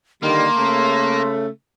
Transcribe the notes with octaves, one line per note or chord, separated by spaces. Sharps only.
D3 D#3 G3 A#3 C6
C#3 A3